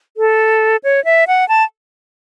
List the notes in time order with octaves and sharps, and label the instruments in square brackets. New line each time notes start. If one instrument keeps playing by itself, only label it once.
[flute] A4
C#5
E5
F#5
A5